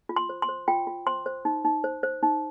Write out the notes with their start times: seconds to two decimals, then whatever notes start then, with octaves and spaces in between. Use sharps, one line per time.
0.09 F4
0.16 C6
0.29 C5
0.42 C6
0.49 C5
0.68 F4 G5
0.87 F4
1.07 C5 C6
1.26 C5
1.45 D#4
1.65 D#4
1.84 C5
2.03 C5
2.23 D#4